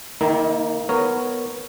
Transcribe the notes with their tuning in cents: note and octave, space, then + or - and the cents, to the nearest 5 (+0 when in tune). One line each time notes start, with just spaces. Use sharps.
D#3 +0 A#3 +0 E4 -45
B3 +0 A#4 -10 C#5 +0